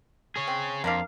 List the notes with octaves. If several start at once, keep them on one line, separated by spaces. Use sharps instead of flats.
G#4 C#5
C4
F2 A#3 D4 F5